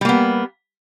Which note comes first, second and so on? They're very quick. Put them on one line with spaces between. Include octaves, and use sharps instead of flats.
G3 A#3 B3